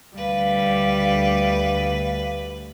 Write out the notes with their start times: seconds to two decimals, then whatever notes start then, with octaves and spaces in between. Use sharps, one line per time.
0.17 D2 G3 B4 F5